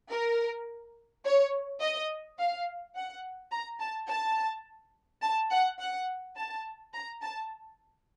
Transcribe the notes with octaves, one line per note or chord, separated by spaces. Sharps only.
A#4
C#5
D#5
F5
F#5
A#5
A5
A5
A5
F#5
F#5
A5
A#5
A5